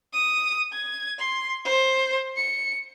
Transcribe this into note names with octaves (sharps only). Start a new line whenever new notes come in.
D#6
G#6
C6
C5
C#7